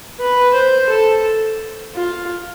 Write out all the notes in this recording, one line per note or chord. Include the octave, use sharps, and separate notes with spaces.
B4
C5
A4
F4